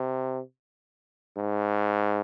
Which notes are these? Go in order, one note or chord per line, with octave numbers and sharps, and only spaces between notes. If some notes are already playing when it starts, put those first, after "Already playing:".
Already playing: C3
G#2